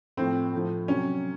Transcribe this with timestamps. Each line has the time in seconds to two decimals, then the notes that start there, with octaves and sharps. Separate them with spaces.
0.17 A2 F3 C4
0.53 A2 F3
0.88 C3 F#3 C#4